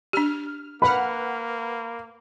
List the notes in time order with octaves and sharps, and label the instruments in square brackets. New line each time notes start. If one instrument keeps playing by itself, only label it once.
[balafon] D4 G4 [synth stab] F6
[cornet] A#3 [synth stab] B4 F#5 F6 [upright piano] B5